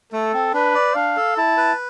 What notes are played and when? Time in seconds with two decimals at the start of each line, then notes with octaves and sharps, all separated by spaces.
0.13 A3 A4
0.33 C4
0.53 D4 B4
0.75 D5
0.95 D4 F5
1.16 A4
1.37 E4 A5
1.57 B4